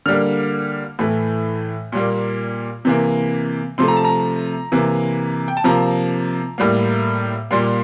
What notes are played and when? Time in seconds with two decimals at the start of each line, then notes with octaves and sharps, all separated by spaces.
0.06 D3 G3 A#3 F6
0.99 A2 E3 A3
1.92 A#2 G3 A#3
2.85 C3 E3 A#3
3.78 C3 F3 A3 C6
3.88 A#5
3.97 A5
4.04 A#5
4.72 C3 E3 A#3
5.48 G5
5.57 A5
5.64 C3 F3 A#3 A#5
6.58 A2 G3 A#3
7.51 A#2 G3 A#3 C6